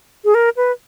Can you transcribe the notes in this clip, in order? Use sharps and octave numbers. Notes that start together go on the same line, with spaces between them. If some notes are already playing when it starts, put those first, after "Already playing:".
G#4
A#4
B4